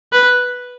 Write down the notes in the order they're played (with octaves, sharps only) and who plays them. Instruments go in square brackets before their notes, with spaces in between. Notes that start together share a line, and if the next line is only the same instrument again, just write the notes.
[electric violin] B4